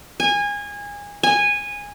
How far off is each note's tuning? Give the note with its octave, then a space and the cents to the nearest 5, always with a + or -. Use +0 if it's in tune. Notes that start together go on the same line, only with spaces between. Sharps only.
G#5 -25
G#5 -15